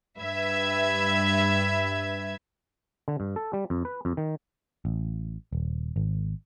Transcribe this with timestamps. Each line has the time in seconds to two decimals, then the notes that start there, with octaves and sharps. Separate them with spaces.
0.19 G2 B4 E5 G#6
3.08 D3
3.20 G2
3.36 A4
3.53 G3
3.70 F2
3.85 B4
4.05 F2
4.17 D#3
4.85 A1
5.53 D#1
5.96 G#1